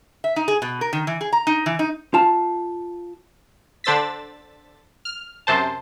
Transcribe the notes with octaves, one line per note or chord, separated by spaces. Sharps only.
E5
D#4
G#4
B2
A#4
D#3
E3
G#4
A#5
D#4
E3
D#4
F4 A5
D3 D4 C5 E6 A6 B6
F6
F#2 C3 C5 A5